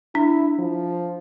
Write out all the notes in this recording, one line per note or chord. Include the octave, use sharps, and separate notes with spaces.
D4 E4
F3